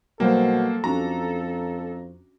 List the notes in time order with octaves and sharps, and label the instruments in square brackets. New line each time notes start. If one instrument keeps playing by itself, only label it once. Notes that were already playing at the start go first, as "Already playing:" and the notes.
[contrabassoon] B2 [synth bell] F#3 G3 G5 [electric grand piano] A#3 C5 [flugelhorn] A4
[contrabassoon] F2 [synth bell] C#4 D4 F#4 [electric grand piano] A#5